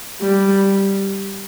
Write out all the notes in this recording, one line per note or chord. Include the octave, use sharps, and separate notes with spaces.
G3